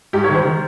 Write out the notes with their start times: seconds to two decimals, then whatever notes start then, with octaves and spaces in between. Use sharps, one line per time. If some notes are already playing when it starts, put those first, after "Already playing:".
0.13 G#2 G4
0.24 C#5
0.29 D#3
0.35 C5
0.45 D#3